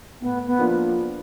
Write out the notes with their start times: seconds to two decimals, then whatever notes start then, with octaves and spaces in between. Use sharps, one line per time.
0.21 A2 B3
0.47 B3
0.59 F3 A#3 D4 F4